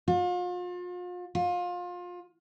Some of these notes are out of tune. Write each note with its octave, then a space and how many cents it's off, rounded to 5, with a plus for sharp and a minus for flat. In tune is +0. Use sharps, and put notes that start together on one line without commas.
F4 +40
F4 +25